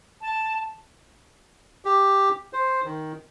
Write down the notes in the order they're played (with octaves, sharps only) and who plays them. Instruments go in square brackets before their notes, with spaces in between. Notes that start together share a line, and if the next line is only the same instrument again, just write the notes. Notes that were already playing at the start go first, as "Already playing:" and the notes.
[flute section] A5
[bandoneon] G4
C5
D#3